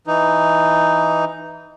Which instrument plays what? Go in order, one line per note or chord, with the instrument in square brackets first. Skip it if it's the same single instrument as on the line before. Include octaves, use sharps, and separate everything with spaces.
[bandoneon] E3 D#4